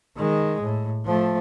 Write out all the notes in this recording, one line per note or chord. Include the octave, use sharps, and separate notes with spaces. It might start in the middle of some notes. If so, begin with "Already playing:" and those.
D#3 G#3
A2
F3 A3